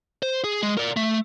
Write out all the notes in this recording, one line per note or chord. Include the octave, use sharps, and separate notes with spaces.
C5
G#4
G#3
A#4 D5
A3